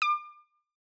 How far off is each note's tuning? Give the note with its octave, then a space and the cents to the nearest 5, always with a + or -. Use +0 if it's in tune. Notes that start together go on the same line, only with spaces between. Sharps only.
D6 +35